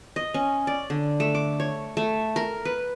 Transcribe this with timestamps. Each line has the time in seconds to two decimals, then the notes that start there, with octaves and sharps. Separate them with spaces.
0.16 D#5
0.34 C#4
0.67 D5
0.90 D3
1.20 A3
1.35 D6
1.60 C#5
1.97 A3
2.36 A#4
2.65 B4